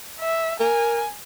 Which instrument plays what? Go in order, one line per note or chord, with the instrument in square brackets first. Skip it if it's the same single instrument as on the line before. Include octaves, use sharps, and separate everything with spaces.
[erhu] E5
[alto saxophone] A#4 [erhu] G#5